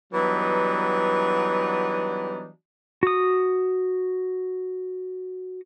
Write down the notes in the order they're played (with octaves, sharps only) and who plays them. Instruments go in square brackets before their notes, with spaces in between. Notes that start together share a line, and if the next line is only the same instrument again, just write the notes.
[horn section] E3 F#3 G3 B3 D4 D#4
[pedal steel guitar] F#4 D#6